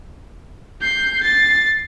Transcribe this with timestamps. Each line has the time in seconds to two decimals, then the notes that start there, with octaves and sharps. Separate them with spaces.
0.81 G6 C7
1.23 A6 C7